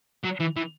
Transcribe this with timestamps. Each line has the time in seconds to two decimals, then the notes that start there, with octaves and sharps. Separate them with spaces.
0.24 F#3
0.40 E3
0.56 E3